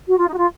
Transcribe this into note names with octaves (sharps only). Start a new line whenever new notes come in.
F#4
F4
D#4
F#4
F4